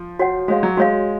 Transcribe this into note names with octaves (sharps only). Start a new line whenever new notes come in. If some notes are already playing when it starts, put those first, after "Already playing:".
Already playing: F3
F#4 C#5 F#5
G#3 F#4 C#5 F5
F#3
G#3 F#4 C#5 F5